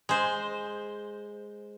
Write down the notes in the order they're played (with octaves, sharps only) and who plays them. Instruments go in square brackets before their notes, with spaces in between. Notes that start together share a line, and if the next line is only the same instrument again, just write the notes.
[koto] G#3 C5